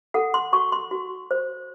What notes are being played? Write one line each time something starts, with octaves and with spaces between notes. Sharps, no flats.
A4 F#5
C6
F#4 C#6
C6
F#4
C5